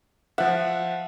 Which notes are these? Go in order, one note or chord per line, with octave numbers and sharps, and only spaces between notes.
F3 E5 F#5